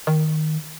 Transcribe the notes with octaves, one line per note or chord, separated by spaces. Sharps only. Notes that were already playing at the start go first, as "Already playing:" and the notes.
D#3